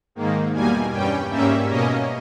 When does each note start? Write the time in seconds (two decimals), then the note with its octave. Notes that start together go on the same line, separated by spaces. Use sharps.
0.15 G#2 D#3 A#3
0.53 E2 B2 G3 A#3 G#5
0.92 G2 G3 C#4 G5
1.30 G#2 G3 A#3 C#4 E5
1.69 B2 A#3 C#4 D#5